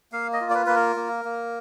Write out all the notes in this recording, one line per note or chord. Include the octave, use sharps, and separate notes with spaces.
A#3 F5
D#5
F4
D5
B4
A#3 B4
A#4
A#3
A#3